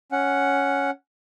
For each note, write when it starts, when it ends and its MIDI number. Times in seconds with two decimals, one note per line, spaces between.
0.12 0.90 61
0.12 0.90 78